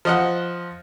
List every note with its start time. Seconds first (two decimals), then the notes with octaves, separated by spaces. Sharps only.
0.05 F3 D#5 F#5